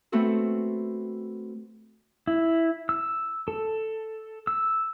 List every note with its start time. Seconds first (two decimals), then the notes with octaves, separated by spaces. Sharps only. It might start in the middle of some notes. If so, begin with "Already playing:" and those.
0.12 A3 B3 C4 F#4 A4
2.27 E4
2.89 E6
3.48 A4
4.47 E6